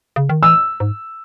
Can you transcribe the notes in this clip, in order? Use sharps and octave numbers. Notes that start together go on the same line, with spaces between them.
C#3
D#3
E3 E6
G#2